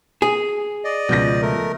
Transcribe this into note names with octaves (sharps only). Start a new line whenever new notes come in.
G#4
D5 D#5
C#2 B2 F3 G6 A#6
A3 A#4